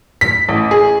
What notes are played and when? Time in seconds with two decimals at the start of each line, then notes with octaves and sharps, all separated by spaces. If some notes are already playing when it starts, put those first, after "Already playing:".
0.21 B6
0.49 A1
0.71 G#4